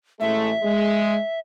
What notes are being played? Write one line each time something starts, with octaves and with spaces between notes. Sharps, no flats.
A1 G#3 A3 E5
G#3